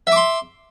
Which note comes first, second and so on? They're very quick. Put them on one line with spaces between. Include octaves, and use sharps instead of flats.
E5 D6 C6